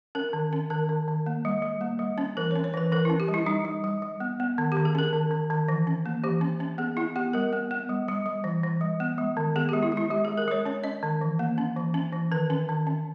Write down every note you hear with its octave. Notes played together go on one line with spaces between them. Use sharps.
C#4 A#4
D#3
C#4
D#3 A#4
D#3
D#3
A#3
G3
G3
A#3
G3
C#4
E3 A#4
C#5
C#4
C#5
E3 B4
E3 A#4
C#4 E4
G4
G3
E4
G3 D#4
G3
G3
G3
B3
B3
D#3
D#3 G4
G#4
C#4 A#4
D#3
D#3
D#3
E3
C#4
A#3
E3 G4
C#4
C#4
B3 G#4
B3 E4
B3 G4
G3 A#4
B3
B3
G3
G3
G3
E3
E3
G3
B3
G#3
D#3
B3 G#4
G#3 G4
E4
G#3
E4
G#3 G4
G#3 G#4
A#4
G#3 C#5
C#4 C#5
C#4 D#5
D#3
E3
A#3
C#4
E3
C#4
E3
D#3 B4
C#4
D#3
C#4